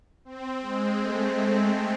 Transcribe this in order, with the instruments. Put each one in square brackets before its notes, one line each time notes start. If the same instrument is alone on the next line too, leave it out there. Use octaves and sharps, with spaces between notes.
[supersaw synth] C4
G#3
A3
C4